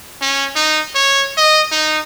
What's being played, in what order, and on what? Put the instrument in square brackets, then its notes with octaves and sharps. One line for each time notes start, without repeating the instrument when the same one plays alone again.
[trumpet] C#4
D#4
C#5
D#5
D#4